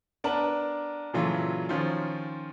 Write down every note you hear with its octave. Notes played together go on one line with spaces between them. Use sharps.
B3 D4 A#4 A5 F#7
A#2 C#3 E3 F#3 F4 A4
D#3 F3 C#4 F4